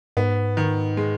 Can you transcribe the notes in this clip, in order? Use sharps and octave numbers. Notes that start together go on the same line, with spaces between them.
G#2 B3
D#3
G#3